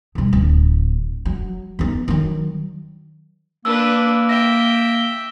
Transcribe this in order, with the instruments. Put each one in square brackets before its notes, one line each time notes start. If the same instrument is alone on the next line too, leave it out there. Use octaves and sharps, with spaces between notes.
[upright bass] B2 G3
D1
F#3
B3 D#4
D#3 F#3
[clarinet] A#3 [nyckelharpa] D4 B4 [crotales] E6
[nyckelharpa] E5 G5 [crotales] A#6